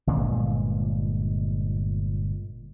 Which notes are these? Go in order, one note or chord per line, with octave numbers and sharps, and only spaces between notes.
G1 A#2 G#3